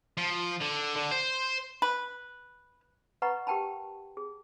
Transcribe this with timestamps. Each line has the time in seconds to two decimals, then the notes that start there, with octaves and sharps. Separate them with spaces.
0.17 F3
0.61 D3
0.96 D3
1.11 C5
1.82 B4
3.22 B4 D#5 F#5 A#5 B5 C#6
3.47 G4 A#4 G5 A5 B5
4.17 G#4